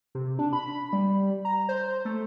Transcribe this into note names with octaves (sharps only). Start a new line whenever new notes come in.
C3
D4
B5
G3
A#5
C5
A3